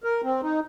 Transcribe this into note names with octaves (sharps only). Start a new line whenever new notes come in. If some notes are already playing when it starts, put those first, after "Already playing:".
A#4
C4
D#4